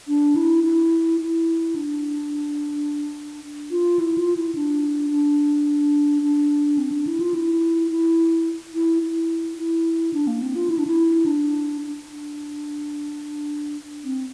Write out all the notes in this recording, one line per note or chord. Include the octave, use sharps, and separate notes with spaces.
D4
E4
E4
E4
D4
F4
E4
F4
E4
D4
D4
D4
C4
D4
E4
F4
E4
E4
E4
E4
E4
D4
A#3
C4
F4
E4
D4
E4
D4
D4
C4